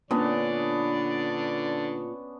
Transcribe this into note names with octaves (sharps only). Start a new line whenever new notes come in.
A#2 D3 B3 C#4 D4 D5